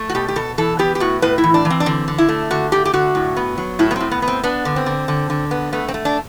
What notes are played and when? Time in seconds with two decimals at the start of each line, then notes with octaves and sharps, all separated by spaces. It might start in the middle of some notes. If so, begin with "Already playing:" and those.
Already playing: A3
0.09 F#4
0.15 B2 G4
0.28 G4
0.36 B2 A4
0.58 E3 A4
0.79 B3 G4
0.95 G4
1.00 A2 F#4
1.22 A2 B4
1.38 E4
1.44 E3
1.54 D4
1.65 E3
1.70 C4
1.80 D4
1.86 D3 C4
2.08 D3
2.18 E4
2.29 A3
2.51 D3 F#4
2.72 A3 G4
2.85 G4
2.93 D3 F#4
3.15 A2
3.37 B3
3.58 F#3
3.79 A2 E4
3.91 B3
3.96 A2 C4
4.11 B3
4.22 B3
4.28 C4
4.43 B3 D4
4.65 D3
4.76 C4
4.86 D3
5.08 D3
5.30 D3
5.51 B3
5.73 A3 B3
5.88 C4
5.94 A3
6.05 D4